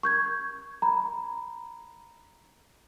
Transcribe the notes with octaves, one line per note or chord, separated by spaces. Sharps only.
C#6 G6 G#6
A#5 B5